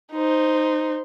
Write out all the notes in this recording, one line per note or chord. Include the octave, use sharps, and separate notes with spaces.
D#4 C5